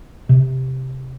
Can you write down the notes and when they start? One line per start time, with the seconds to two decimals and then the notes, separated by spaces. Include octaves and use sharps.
0.29 C3